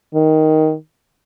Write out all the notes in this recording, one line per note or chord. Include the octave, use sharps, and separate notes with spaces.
D#3